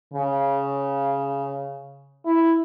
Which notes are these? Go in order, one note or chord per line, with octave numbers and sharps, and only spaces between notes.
C#3
E4